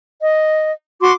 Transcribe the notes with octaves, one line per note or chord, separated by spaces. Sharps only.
D#5
F#4 C6 D6